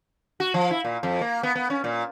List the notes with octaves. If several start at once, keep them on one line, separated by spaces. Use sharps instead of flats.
F#4
F3
E4
A#2
F2
A#3
B3
B3
C#4
A#2